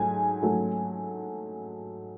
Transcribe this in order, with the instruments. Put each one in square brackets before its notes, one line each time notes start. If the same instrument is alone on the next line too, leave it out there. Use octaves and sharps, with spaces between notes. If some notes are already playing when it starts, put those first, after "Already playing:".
Already playing: [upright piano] G#2 F#3 A3 G#5
G#2 F#3 A3